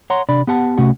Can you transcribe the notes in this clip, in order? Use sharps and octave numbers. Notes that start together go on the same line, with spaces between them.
C#5 F#5 A#5 C6
C3 D4 D5 B5
B3 G4 F#5 A5
C2 C3 A3 C#4 F#4 F#5